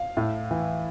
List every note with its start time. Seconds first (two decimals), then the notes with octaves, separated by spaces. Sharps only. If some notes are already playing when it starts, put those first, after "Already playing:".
Already playing: F5
0.17 A2
0.51 E3